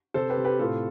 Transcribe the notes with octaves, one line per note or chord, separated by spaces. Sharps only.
C3 A4 C5
G4 B4
C3
G4 B4
A2 F4 A4